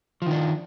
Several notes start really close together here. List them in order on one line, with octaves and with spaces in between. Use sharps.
F3 D#3 D4